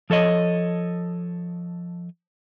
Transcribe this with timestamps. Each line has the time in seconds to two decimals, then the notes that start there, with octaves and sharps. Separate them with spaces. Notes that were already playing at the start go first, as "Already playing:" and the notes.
0.10 F3 A4 C#5 D#5